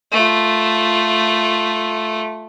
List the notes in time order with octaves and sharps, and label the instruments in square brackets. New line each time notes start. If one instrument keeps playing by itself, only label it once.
[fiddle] A3 F4